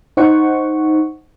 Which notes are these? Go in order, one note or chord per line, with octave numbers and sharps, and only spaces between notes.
D#4 C5 F#5 C#6